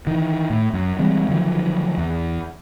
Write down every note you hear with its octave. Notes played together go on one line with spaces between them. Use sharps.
D#3 E3
A2
F#2
E3 G3 G#3 C4
D3 D#3 F3 F#3
E2